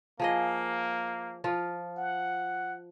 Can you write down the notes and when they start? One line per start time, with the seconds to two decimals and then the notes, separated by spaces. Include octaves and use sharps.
0.20 F3 A#3 G#4 D#5
1.44 F3 F4
1.97 F#5